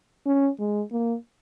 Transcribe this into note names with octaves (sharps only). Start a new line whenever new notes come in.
C#4
G#3
A#3